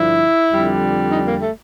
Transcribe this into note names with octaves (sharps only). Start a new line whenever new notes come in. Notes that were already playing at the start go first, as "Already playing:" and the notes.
Already playing: G2 D3 F3 E4
F2 D3 G3
D#4
A#3
A3